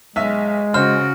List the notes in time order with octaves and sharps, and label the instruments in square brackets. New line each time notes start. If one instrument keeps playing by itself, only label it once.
[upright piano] B1 E5 [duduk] G#3
[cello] C#3 F#4 [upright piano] C5 [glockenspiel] F6